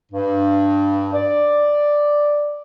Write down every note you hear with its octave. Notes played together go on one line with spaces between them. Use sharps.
G2
D5